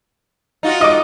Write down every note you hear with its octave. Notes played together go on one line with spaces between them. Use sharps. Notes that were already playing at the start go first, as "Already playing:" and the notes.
D#4 F4 F#4
D#5 D6